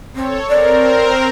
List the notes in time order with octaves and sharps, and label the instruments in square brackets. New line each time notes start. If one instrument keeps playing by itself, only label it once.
[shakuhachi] C4 [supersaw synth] A4 C#5
[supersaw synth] C4 A#4 [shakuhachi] D5